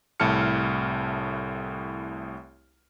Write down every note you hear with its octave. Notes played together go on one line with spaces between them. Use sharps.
C2 A2 E4 A5 F6 C#7